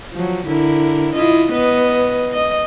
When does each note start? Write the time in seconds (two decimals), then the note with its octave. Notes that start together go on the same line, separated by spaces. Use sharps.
0.13 F3 F#3
0.46 D3 E4 A#4
1.15 E4 F4 D#5
1.53 B3 B4 D#5
2.33 D#5